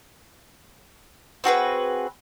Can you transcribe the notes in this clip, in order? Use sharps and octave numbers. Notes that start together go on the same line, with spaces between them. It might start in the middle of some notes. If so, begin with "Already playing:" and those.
C4 F#4 G#4 B4